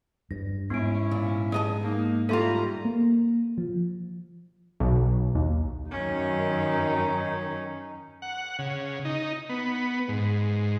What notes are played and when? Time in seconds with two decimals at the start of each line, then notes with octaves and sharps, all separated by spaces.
0.31 G2 A#6
0.70 G#2 B3 C#4 E4 D7
1.11 A#2
1.52 G#3 D#5 A5
1.82 A#3 D#4
2.29 G3 A3 F4 A4 E5 A#5 C6
2.85 A#3
3.58 F3
4.80 B1
5.35 D#2
5.91 F#2 D#3 C#4 D#4
8.22 F#5
8.59 C#3
9.05 D#4
9.49 B3
10.08 G#2